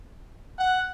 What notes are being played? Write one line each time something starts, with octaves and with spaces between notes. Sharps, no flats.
F#5